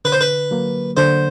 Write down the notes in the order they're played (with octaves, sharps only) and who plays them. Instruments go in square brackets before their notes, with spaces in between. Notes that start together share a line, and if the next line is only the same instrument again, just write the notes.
[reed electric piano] D3 [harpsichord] B4
[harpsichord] C5
B4
[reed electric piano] F#3 A#3
[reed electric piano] D3 [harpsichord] C5